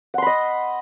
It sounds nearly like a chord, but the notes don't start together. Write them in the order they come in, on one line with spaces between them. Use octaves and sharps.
F#5 C6 B5 D#5